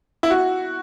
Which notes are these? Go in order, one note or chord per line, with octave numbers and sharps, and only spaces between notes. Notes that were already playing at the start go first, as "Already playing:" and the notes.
E4
F#4